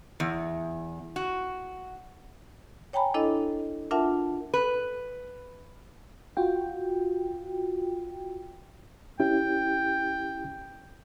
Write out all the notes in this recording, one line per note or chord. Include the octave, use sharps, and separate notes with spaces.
E2
F#4
C#5 G5 G#5 A#5 B5
D4 E4 A4 D#5
D4 F4 A#4 E5 F#5 A5
B4
F4 F#4 G5
C#4 E4 G4 G5